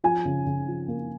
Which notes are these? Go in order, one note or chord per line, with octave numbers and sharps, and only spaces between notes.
F3 G#5
C#3
C#3
F3
A#3